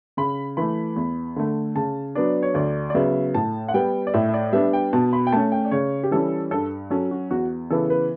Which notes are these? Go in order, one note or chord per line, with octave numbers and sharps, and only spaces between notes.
C#3 B5
E3 A3 B5
E2
D3 A3
C#3 A5
F#3 B3 D4 D5
C#5
D2 D5
D5
C#3 F#3 B3 E5
A2 A5
F#5
G3 B3 G5
D5
A2 E5
E5
D5
G3 B3 D4 E5
G5
B2 A5
B5
G5
A3 C#4 A5
G5
D5
C#3 C#5
G4
E3 G3 C#4 A4
G2 A4
F#3 C#4 A4
F#4
E2 F#4
C#3 E3 B3 A4
B4